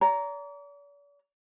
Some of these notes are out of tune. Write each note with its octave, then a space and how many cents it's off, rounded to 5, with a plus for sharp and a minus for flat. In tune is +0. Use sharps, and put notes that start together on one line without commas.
D5 -45 A#5 +0